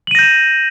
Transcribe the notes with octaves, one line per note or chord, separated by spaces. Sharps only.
G6 A#6 D#7 E7 F#7